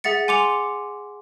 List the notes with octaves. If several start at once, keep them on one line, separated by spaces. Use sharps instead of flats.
G#4 E5 F#5 A6 C#7
G#5 C6 D6 C#7 F7